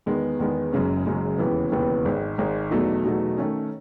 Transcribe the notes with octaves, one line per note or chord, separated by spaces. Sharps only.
E2 D#3 G#3 B3
E2 D#3 G#3 B3
F#1 F#2 C#3 G#3 C#4
F#1 F#2 C#3 G#3 C#4
E1 D#2 C#3 E3 B3
E1 D#2 C#3 E3 B3
G#1 G#2 D#3 G#3 D#4
G#1 G#2 D#3 G#3 D#4
E2 B2 F#3 A3 D#4
E2 B2 F#3 A3 D#4
D#3 A3 C#4